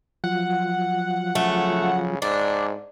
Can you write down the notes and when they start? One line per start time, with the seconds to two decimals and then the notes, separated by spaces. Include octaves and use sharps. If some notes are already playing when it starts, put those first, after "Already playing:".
0.24 F3 F#3 F4 F#5
1.35 C#3 A3
2.22 G#2 D4